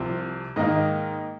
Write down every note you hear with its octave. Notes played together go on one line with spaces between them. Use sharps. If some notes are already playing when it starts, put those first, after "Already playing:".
Already playing: C2 C3 F3 C4
G#2 D#3 A#3 D#4 D#5